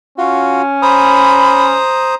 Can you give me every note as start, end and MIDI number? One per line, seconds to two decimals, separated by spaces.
0.18 1.78 61
0.18 0.62 65
0.18 0.62 66
0.82 2.15 72
0.82 2.15 82
0.82 1.66 83
0.82 2.15 87